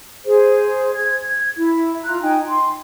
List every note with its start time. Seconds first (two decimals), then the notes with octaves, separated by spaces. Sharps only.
0.25 G#4 C5
0.94 G#6
1.56 E4
2.04 F4 A#5 F#6
2.22 D#4 G5 G#5
2.49 C6